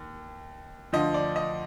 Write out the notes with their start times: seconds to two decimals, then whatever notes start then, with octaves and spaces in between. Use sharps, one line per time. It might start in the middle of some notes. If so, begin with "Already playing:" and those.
Already playing: D#2
0.92 D2 D3 F3 D#5
1.14 D5
1.36 D#5